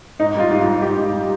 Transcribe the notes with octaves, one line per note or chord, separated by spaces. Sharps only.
G#2 D#4
G3 F4
G#2
F4
G3
G#2 G4
G#2
G3